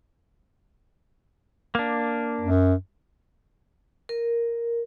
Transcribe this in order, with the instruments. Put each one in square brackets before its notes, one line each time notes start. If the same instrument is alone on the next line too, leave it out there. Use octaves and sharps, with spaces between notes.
[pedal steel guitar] A#3 D4
[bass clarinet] F#2
[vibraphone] A#4